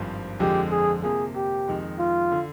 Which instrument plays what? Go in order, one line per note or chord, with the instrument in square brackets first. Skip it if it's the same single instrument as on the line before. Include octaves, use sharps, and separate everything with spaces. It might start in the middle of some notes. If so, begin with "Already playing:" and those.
Already playing: [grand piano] G#1 G2 F3
[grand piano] F2 D3 F3 G#3 [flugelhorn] G4
[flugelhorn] G#4
[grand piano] C3 F3 A#3 [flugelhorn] G#4
[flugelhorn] G4
[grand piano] F2 D#3 G#3
[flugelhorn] F4
[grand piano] D3